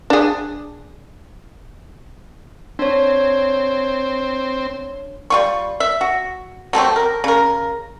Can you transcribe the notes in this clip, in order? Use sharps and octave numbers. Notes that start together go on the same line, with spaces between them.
D4 G#4
C4 D4 C#5
G3 F4 C#6
E5
F#4
F#3 A3 C4 G4
A#4
C#3 A#4